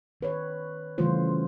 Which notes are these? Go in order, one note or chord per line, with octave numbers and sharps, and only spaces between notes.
D#3 B4 C#5
C#3 E3 G3 A3 F4 C5